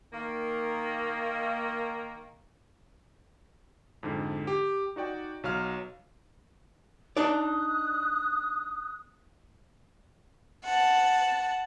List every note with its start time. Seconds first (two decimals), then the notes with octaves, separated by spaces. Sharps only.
0.13 D#3 A#3
4.03 F2 G#2 D3
4.47 G4
4.96 D#4 F#4 D5 G5
5.43 B1 F#3 F5 F6
7.17 D4 D#4 D5 D#6 F#6
10.64 F#5 A5